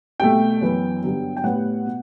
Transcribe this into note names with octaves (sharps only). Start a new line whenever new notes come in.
C2 B2 A3 G5
F#2 E3 B3
G2 D3 F#3 B3
G5
A2 G3 B3 F#5
B2